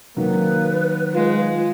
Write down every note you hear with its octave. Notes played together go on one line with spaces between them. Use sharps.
D#3 F#3 A#3 B4
G#3 F4